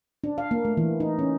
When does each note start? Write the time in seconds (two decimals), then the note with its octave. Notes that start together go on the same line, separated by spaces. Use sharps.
0.24 D4
0.38 F5
0.51 A#3
0.65 A3
0.77 E3
1.00 D#4
1.19 C#4